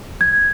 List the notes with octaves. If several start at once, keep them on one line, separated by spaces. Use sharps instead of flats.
G#6